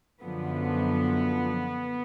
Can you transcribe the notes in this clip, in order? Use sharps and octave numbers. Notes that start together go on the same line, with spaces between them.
F#2 D3 F3 B3